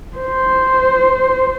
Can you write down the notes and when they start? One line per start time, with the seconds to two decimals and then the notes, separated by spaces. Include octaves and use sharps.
0.17 C5